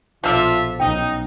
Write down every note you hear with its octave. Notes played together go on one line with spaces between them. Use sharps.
A#1 B2 F3 F4 A4 D5 E5
B1 C#4 D#4 G5